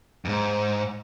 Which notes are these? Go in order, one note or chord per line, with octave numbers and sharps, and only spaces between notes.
F2 G#2